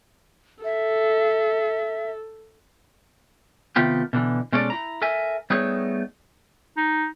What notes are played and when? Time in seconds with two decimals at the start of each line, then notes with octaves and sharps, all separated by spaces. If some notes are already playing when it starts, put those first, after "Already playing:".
0.64 A4 E5
3.76 C3 D#3 A3 B3 F4 G4
4.13 B2 D3 E3
4.52 B2 G#3 C#4 A4 D5
4.70 E4 A#5
5.02 A4 A#4 E5 G#5
5.50 G3 A3 B3 D#4 G#4 C#5
6.77 D#4